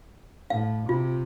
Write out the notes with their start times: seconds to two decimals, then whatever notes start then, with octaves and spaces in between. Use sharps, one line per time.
0.50 A2 F5
0.89 C3 F4